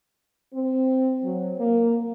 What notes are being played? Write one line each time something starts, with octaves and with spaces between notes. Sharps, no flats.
C4
F#3
A#3